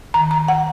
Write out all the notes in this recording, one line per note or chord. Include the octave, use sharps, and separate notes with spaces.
D#3 A#5
A#5
F#5